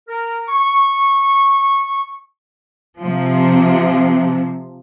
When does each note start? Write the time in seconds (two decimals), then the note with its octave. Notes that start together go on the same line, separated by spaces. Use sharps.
0.08 A#4
0.48 C#6
3.00 C3 F3